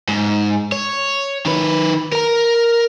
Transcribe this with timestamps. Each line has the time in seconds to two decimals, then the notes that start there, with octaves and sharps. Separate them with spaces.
0.08 G#2
0.72 C#5
1.46 D#3 B4
2.12 A#4 A#5